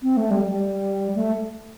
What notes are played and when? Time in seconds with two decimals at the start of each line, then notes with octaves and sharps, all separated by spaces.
0.03 C4
0.17 A3
0.31 G3
0.45 G3
1.15 A3